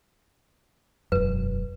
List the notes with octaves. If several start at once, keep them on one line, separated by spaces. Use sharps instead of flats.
E1 F#2 B4